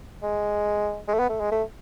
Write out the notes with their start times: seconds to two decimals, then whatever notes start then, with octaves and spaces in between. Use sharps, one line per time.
0.22 G#3
1.08 G#3
1.14 A3
1.19 B3
1.29 A3
1.40 G#3
1.51 A3